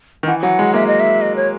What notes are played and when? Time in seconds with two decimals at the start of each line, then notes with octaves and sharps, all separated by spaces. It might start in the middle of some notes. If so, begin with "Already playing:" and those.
0.23 D#3
0.28 E3 F#5
0.43 F#3 F#5
0.59 G#3
0.74 A#3 E5
0.87 D#5
1.00 E5
1.21 D#5
1.36 C#5